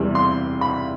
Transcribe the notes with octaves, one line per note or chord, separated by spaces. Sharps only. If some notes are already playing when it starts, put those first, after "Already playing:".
Already playing: E2 C3 E3 G3
C6
B5